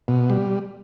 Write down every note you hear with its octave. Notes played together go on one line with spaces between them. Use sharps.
B2
G3